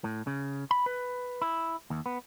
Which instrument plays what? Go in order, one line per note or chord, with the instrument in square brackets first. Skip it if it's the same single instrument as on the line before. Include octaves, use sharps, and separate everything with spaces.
[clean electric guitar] A2
C#3
B5
B4
E4
D#2
B3